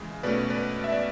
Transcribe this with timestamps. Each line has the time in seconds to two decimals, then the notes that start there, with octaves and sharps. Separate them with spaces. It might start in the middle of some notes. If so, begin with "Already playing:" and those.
Already playing: C#3 E3 G#3
0.23 B2 A3 C#4 B4 D5
0.50 B4 D5
0.84 E5
0.92 D5